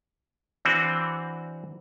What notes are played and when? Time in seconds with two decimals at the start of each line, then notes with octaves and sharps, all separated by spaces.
0.65 E3 C4 D4 F#4